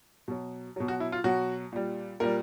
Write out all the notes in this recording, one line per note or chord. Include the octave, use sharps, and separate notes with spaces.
B2 F#3
B2 F#3
F#4
E4
F4
B2 F#3 F#4
A#2 G3
A#2 G3 A#4